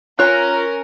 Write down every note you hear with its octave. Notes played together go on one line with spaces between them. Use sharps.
C#4 F4 A#4 C#5 F#6